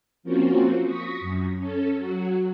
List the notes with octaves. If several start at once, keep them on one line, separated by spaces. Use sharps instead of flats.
F3 A#3 C4 C#4 F4 F#4
C#6 D#6 A#6 B6
F#2
C#4 A4
F#3 F#4